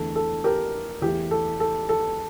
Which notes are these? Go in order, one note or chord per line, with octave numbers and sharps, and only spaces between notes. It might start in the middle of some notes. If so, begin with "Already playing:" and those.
Already playing: E2 D3 A3 A4
A4
G4 A#4
E2 E3 A3 G4
A4
A4
A4